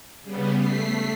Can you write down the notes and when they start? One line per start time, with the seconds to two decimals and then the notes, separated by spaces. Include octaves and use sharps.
0.22 C#3 G3 B3
0.58 A3 B6 C7